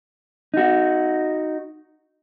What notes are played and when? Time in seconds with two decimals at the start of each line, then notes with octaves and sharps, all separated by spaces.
0.54 D#4 F#4